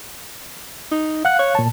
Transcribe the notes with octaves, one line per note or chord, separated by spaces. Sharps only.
D#4
F5 F#5 F#6
C#5
A#2 A5